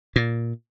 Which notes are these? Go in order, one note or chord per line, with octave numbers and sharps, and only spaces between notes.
A#2